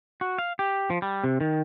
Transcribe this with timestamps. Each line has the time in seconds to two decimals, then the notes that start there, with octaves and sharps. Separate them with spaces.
0.21 F#4
0.38 F5
0.59 G4
0.90 F3
1.02 G3
1.24 C3
1.41 D#3